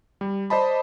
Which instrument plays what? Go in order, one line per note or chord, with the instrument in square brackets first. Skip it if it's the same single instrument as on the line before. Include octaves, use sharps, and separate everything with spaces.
[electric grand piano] G3
C5 D5 D#5 A5 B5